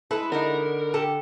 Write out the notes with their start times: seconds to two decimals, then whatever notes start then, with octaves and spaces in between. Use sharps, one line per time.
0.11 G#3 E4 A4 B4
0.32 D3 B3 D4 D#4 A#4
0.94 G4 A4